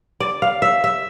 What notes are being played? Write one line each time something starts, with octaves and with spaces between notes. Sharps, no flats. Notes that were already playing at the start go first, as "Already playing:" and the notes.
D5
F5
E5
E5